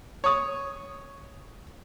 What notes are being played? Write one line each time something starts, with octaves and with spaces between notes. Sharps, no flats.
C#5 D#6